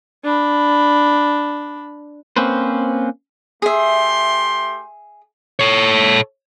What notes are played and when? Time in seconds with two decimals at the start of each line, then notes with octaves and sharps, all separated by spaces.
0.24 D4 B5
2.36 A#3 C4 C#4 B4 C5
3.62 A3 G4 G#4 E5 C6
5.59 A4 C#5